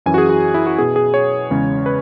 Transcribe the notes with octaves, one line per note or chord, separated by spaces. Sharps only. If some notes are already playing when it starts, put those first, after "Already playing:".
F#2 E3 C#4 G#5
F#4
G#4
F#4
E4
F#4
B2 B3 G#4
G#4
C#5
E2 C#3 G#3 C#4
B4